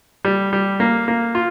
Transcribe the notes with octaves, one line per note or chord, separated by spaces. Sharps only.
G3
G3
A#3
A#3
F4